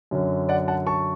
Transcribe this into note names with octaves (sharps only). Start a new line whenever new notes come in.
F#2 D3 F#3 C#4
D5 F#5
F#5 A5
A5 C#6